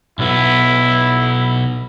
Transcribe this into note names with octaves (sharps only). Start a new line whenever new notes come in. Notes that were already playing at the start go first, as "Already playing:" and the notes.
B1 B3 E4